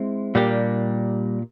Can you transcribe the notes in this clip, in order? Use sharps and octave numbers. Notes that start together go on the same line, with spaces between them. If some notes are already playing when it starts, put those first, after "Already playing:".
Already playing: G#3 C4 E4
A#2 G3 A#3 D4 G4